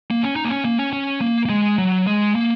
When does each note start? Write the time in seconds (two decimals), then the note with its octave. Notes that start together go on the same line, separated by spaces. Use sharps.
0.11 A#3
0.23 C#4
0.36 D#4
0.45 A#3
0.50 C#4
0.65 A#3
0.79 C#4
0.93 C#4
1.21 A#3
1.45 A#3
1.50 G#3
1.78 F#3
2.07 G#3
2.36 A#3